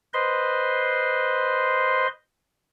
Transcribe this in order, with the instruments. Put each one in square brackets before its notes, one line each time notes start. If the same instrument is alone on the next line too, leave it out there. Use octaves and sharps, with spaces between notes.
[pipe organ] B4 C5 D#5 C6